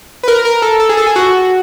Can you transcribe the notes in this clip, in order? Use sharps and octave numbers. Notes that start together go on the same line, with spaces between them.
B4
A#4
A#4
A4
A4
G#4
A4
G#4
F#4